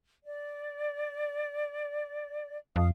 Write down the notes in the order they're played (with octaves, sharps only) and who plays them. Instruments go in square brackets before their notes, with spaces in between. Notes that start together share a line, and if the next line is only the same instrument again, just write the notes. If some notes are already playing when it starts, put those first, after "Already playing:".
[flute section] D5
[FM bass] F2 [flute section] F5 D#6